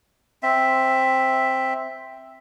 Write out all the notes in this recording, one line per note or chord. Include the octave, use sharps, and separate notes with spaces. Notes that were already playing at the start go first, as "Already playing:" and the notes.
C4 E5